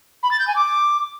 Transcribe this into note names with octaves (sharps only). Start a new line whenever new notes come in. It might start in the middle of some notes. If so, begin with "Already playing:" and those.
B5
A6
G6
G#5
D6